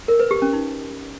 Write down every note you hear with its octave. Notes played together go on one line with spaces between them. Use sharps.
A#4
B4
G4
C#4
D#4